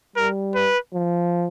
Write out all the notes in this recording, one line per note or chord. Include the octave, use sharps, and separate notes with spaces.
G3 A#4
B4
F3